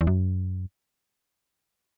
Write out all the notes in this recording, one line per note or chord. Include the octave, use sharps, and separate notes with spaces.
E2
F#2